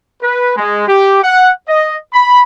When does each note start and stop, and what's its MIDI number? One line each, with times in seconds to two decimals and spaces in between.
0.21 0.54 71
0.56 0.84 56
0.87 1.21 67
1.22 1.51 78
1.68 1.96 75
2.13 2.42 83